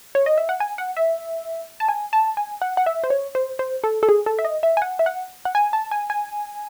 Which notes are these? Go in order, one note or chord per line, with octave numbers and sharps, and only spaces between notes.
C#5
D#5
E5
F#5
G#5
F#5
E5
A5
G#5
A5
G#5
F#5
F#5
E5
C5
C#5
C5
C5
A4
A4
G#4
A4
E5
D#5
E5
G#5
F#5
E5
F#5
F#5
G#5
A5
G#5
G#5